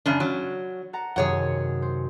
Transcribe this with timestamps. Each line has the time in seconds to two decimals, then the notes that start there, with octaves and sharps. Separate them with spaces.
0.06 F#2 C#3 D4
0.20 F#3
0.93 F#5 A5 A#5
1.16 F#2 C3 D#3 G#4 C#5 F#5
1.82 C5